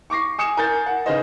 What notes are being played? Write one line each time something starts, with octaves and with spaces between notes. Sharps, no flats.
C#6 D6 A#6 C7
G#5 D#6 C#7 E7
A#4 G#5 G6 A6
F#5
C#3 D#4 G#4 B4 C5 D#5